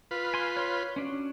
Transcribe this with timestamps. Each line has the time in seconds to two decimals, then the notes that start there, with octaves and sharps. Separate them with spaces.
0.11 F4 B4
0.34 G#5 C6
0.57 C#5 C6
0.96 C#4 D4 F#4